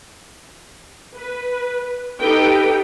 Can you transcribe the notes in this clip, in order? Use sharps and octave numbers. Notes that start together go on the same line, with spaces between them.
B4
D#4 G4 A4 B4 G5